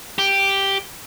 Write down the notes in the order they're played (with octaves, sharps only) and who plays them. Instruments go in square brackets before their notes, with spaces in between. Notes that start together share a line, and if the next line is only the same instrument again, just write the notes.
[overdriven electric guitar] G4